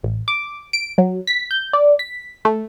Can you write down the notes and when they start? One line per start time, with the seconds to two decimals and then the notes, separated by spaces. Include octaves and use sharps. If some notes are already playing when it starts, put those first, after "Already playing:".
0.03 A1
0.28 D6
0.73 D7
0.98 F#3
1.27 B6
1.51 G6
1.73 D5
1.99 B6
2.45 A3